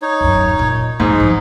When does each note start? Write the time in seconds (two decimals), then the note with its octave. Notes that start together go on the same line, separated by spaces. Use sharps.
0.02 D#4 C#5
0.21 D#1 F#2
0.59 A#2
1.00 A1 F2 G#2 D#4
1.20 E3 F3